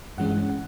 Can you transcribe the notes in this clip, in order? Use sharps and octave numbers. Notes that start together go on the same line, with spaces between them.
G2 E3 G#3 C#4 F#5
F#5